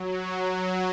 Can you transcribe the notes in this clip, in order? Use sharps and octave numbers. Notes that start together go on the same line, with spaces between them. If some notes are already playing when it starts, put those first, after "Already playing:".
Already playing: F#3
F#3